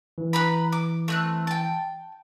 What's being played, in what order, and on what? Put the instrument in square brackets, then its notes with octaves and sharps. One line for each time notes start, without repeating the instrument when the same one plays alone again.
[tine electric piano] E3
[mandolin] B4 A#5 B5
D6
A3 C4 F#6
G5 A5